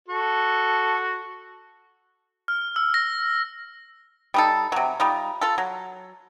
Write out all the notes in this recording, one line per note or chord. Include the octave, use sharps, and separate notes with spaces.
F#4 A4
F6
E6
A#6
G3 D#4 A4
C3 F#3
G3 D#4 F4
F4 A4
F#3